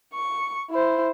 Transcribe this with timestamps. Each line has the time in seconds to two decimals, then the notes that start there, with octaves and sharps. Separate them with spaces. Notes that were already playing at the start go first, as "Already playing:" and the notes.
0.14 C#6
0.71 E4 C5